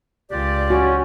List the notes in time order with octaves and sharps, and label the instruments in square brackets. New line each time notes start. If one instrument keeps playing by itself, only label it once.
[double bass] C#2 [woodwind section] F4 G4 D5
[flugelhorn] C#4 [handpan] F#4